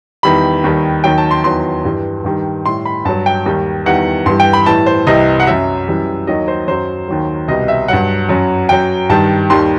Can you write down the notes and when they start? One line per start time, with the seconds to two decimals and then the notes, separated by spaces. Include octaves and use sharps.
0.23 E2 D#3 G3 B5
0.64 D#2 D#3 G3
1.04 D#2 D#3 F#3 G5
1.18 A5
1.31 C6
1.44 E2 D#3 F#3 C6
1.85 G2 E3 G3
2.24 G2 D#3 G3
2.65 A2 G3 C6
2.85 B5
3.05 G2 F#3 A5
3.26 G5
3.46 D#2 D#3 G3
3.86 E2 D#3 G3 F#5
4.26 G2 E3 G3 C6
4.40 G5
4.53 B5
4.66 A2 E3 G3 A5
4.86 C5
5.07 C2 C3 E3 G3 D#5
5.40 F#5
5.47 F#2 F#3 E5
5.88 F#2 E3 G3
6.27 D#2 D#3 F#3 D#5
6.48 C5
6.68 F#2 F#3 C5
7.08 D#2 D#3 F#3
7.48 C2 B2 G3 D#5
7.68 E5
7.88 G2 F#3 F#5
8.29 F#2 F#3
8.69 F#2 F#3 G5
9.10 G2 D#3 G3 A5
9.50 D#2 D#3 G3 C6